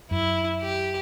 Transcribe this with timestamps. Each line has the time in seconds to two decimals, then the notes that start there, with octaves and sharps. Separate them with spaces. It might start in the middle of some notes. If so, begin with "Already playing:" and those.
0.11 F#2 E4
0.61 G4